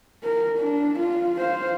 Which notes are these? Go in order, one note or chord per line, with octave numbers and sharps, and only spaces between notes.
A#4
D4
F4
C5 F5